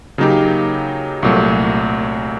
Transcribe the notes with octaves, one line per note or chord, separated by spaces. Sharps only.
C#3 F#3 A#3 D#4 G4
C2 A#2 F#3 A3